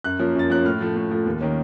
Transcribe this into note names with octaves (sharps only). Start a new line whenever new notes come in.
F#2 F#6
F3 A#3 C#4
F#2 A6
F3 A#3 C#4 F#6
A2 F6
F3 A3
A2
F3 A3
D#2
D#3 A#3 C#4